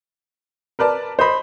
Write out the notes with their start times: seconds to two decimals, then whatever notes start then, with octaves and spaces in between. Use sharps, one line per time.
0.79 A#4 B4 D5 A5
1.19 C5 D#5 B5